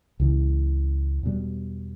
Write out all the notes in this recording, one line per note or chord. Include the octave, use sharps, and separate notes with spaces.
C#2 C#3 E3
E2 B2 G3